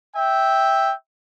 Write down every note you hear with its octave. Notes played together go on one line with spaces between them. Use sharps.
E5 G5